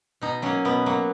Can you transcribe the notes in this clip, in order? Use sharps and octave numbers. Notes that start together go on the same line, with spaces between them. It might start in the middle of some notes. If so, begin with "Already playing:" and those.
B2 D#4
F#3 A#3 C#4
B2 B3
F#3 A#3